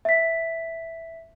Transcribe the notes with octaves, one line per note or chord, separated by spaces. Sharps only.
E5 B6